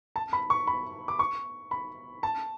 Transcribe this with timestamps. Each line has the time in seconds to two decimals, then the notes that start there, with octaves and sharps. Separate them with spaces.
0.16 A5
0.33 B5
0.50 C#6
0.67 B5
1.08 D6
1.19 C#6
1.71 B5
2.23 A5